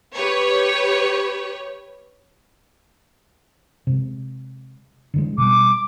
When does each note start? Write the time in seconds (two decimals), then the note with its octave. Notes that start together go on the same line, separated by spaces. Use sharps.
0.15 G4 B4 C#5
3.87 C3 G#3
5.14 D3 E3 G#3
5.38 B2 G3 D6